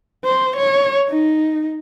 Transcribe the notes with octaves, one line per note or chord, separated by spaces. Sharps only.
C5
C#5
D#4